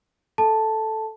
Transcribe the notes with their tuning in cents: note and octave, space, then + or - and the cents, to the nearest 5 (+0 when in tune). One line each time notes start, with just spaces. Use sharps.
A4 -5 A5 +0